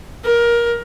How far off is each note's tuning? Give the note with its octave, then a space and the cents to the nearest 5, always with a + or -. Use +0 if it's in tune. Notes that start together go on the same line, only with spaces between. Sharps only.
A#4 +20